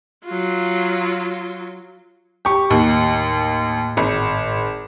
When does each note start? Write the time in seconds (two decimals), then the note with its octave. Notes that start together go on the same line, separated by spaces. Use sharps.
0.24 F#3 F4
2.45 G4 C#6
2.70 D#2 A2
3.97 G#1